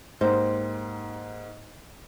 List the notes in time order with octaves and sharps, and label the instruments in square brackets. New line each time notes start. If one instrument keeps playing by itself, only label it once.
[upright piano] G#2 A#3 [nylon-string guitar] D#4 G4 C5